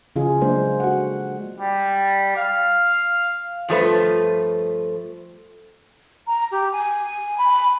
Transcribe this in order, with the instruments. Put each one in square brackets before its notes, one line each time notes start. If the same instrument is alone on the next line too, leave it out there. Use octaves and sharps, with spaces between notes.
[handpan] C#3 F3 F4 G#4
F#3 G#3 A#3 D4 C5
F#4 A4 F#5
[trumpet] G3
F5
[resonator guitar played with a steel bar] G2 F3 A3 B4
[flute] A#5
G4
G#5
B5